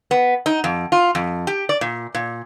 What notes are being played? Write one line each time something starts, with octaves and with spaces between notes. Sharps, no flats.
B3
D#4
F2
F4
F2
G4
D5
A#2
A#2